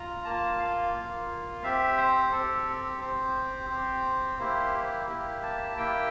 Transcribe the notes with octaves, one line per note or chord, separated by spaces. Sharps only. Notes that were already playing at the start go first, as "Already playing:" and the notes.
Already playing: F4 A#5
A#3 F4 A5
F5
A#3 F4
C4 G4 E5
C5
C4 G4 A4
C4 G4 C5
C4 G4
A#3 E4 G4 C5
A#3 E4 G4
A5
A#3 E4 G4 G5